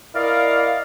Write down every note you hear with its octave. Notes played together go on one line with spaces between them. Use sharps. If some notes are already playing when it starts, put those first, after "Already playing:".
E4 A#4 D5 D#5 F5